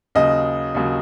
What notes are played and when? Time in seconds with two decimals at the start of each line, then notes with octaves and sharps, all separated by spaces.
0.15 D#2 C#3 F#3 D#5
0.75 D#2 C#3 F#3